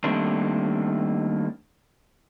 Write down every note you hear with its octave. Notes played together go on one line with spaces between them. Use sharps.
D#3 G3 A3 A#3 C4 D4